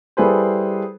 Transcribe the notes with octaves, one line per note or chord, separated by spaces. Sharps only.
G3 E4 G#4 A4 B4 C5